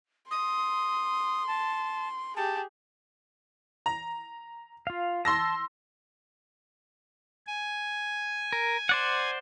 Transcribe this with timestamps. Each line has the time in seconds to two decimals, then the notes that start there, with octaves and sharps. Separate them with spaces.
0.31 C6 D#6
1.47 A5
2.36 G4 G#4 A5
3.86 A#5
4.87 F4 F5
5.25 A5 C6 E6 A#6
7.47 G#5
8.53 A#4
8.89 C5 D5 F#5